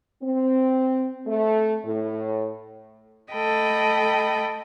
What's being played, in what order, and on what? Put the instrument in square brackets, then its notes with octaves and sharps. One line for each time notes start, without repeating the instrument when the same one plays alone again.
[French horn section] C4
A3
A2
[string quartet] A3 A4 D#5 G5 B5